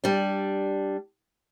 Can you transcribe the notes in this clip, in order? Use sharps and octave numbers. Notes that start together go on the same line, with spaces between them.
G3 D4